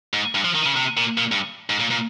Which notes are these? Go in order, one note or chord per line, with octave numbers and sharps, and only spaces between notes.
G#2
G2
F3
D#3
C#3
C3
A#2
A#2
G2
G#2
A#2
A#2